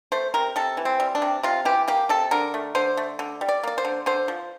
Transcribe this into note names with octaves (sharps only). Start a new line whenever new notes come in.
A3 C5
C3 A#4
C3 A4
E3
C4
G3
D4
C3
C3 F4
E3 G4
A#3 G4
C3 A4
D3 A#4
A3
D3 C5
A3
D3
G3
D5
A#3 D5
C5
D3
D3 C5
F3